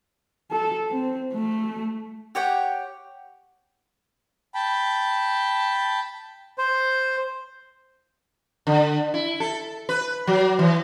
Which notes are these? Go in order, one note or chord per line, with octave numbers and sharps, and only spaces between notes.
A4
C4
A3
G4 C#5 F#5 G5
G5 A5 B5
C5
D3
E4
A4
B4
F#3
E3